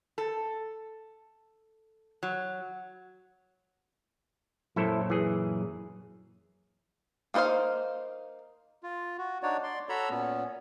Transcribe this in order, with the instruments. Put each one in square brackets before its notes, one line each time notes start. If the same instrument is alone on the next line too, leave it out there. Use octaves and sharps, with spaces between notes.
[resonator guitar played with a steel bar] A4
F#3
[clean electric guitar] F#2 A#2 F#3 [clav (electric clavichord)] E4 A4 C5
[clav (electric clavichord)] E3 G#4
[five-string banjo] A#3 D#4 B4 C5 F5
[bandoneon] F4
F#4
D4 D#4 F#4 C#5 D5
D5 C6
F#4 A4 C#5 A#5 B5 E6
A#2 B3 C#4